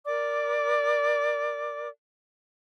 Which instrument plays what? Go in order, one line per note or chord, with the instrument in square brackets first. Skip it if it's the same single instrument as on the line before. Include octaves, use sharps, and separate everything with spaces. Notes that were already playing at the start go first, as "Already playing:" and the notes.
[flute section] A#4 D5 D6